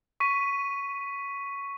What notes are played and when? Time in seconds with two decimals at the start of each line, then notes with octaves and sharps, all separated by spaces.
0.20 C#6 B6 D#7